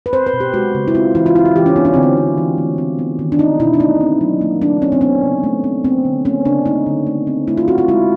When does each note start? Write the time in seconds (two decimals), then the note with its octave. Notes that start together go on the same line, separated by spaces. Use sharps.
0.06 B4
0.13 C4 C5
0.26 B4
0.33 B2
0.40 G4
0.53 G#3 F#4
0.75 C#3
0.88 E4
0.94 C4 F4
1.15 E3 E4
1.26 F4
1.35 C4 E4
1.45 F#4
1.56 E3 G4
1.66 C#4
1.76 B3 D4
1.85 C#4
1.94 D3 C4
2.03 C#4
2.17 C4
2.37 E3
2.58 A3
2.78 C4
2.99 B3
3.19 D#3
3.32 D4
3.39 C4 D#4
3.59 B2 E4
3.74 D4
3.80 A3 D#4
4.01 C4
4.21 F#3
4.41 A#3
4.62 A3 D4
4.82 C4 C#4
4.92 C4
5.01 B3 C#4
5.23 C#3
5.44 A3
5.64 C4
5.84 B3 C4
6.05 D3
6.25 A#3 C#4
6.45 C#3 D4
6.66 A3 D#4
6.86 D3
7.07 A3
7.27 C4
7.47 A3 E4
7.58 F4
7.68 C4 F#4
7.78 F4
7.88 G#3 E4